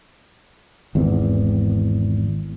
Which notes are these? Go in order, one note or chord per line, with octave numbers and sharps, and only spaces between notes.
G#1 E2